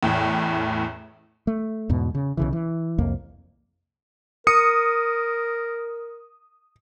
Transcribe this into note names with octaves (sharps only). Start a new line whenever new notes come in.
A1 E2 A2
A3
E2 G#2 B2
C#3
B1 C#3 E3
E3
C2 F2 A#3
A#4 D#6 C#7